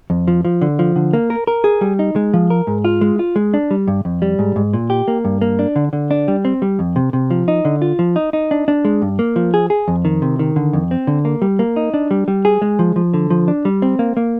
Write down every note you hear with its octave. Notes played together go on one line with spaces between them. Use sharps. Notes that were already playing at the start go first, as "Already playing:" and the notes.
F2
F3
F3
D3
F3
D3
A#3
A#4
A#4
G#4
G3
D#4
G#3
F3
A#4
G#2
F4
G#3
F4
G#3
D4
G3
G2
F2
G3
G#2
G#2
A#2
G4
A#3
G2
A#3
D4
D3
D3
D4
G3
C4
G3
F2
C3
C3
F3
D#4
D3
F4
F3
D#4
D#4
D4
D4
G#3
G2
A#3
F3
G#4
G#4
F2
D#3
C3
D#3
D3
F2
C4
D3
A#3
G3
A#3
D#4
D4
G3
G3
G#4
G#3
F3
F3
D3
F3
D4
G3
C4
A#3
A#3